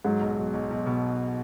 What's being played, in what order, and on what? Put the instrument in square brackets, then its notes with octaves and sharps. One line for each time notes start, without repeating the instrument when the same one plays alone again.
[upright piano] G#2 [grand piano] F#3
[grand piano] B1
B1
B1
B1
B2